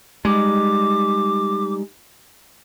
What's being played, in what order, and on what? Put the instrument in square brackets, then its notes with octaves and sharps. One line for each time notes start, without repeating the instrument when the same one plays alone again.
[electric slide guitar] G3 D#4 [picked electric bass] G#3 [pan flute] D6